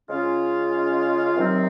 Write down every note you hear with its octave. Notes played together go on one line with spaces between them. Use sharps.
C#3 G#3 C#4 F4
C3 D#3 F#3 C4 D#4